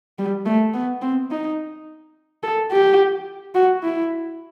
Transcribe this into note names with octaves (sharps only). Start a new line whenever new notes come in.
G3
A3
B3
C4
D#4
A4
G4
F#4
E4